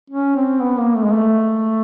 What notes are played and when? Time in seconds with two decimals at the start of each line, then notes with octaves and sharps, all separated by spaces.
0.10 C#4
0.36 C4
0.61 B3
0.79 A#3
0.95 A3
1.05 G#3
1.13 A3